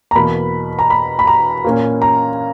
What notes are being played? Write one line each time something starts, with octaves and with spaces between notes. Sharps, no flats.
A#5
E2 B2 A#3 B5
A#5
B5
B5
A#5
A#2 A#3 C#4
A#5